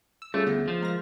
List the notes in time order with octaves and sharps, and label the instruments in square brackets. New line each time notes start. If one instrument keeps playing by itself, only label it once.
[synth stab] E6
[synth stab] G3 C#4 F4 [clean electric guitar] A3 [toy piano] G#4
[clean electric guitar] D2 [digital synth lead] B3
[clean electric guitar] F3
[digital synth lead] G#3 [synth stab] A#4 F5 A#6